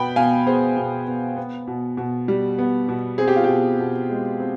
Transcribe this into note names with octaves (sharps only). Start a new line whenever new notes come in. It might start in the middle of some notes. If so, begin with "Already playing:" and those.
Already playing: B2 B3 G5 B5
B2 F5 G#5
B3 G#4 C5
B2
B3
B3
B2
B2
G3
B3
B2
C4 G#4
G4
F4
G4
B2
B2
G#3
C4